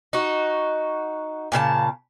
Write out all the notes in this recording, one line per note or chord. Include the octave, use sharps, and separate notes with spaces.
D#4 F#4
A#2 C#3 A4 A5